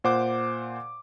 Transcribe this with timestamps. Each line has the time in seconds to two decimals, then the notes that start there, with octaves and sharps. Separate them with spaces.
0.04 A#2 C5 F#5 D6